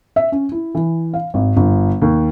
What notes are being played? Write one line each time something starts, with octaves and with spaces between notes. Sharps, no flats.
E5
C#4
E4
E3
F5
G#1
G1
D#2